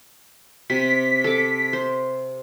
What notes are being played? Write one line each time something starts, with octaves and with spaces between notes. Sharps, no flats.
C3 B6
A4 D6
C5